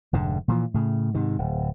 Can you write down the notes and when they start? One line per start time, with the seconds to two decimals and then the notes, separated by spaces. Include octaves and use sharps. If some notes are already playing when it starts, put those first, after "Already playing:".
0.13 F1 G#2 D3
0.48 A#2 E3 F3
0.74 A2 C#3
1.14 G#2 C3 D#3
1.39 D1